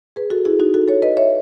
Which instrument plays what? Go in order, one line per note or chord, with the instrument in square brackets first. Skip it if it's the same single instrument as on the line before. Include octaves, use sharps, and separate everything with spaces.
[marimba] G#4 B4
F#4 A4
E4 G#4
D#4 F#4
F#4 A4
A4 C#5
B4 D#5
C#5 E5